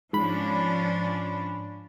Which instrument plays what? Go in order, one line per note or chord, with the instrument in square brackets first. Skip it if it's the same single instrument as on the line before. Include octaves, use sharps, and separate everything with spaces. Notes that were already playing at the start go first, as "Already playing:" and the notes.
[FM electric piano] G#2 B5 [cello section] F3 C#4 D4